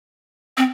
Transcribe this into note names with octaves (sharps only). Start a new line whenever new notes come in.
C4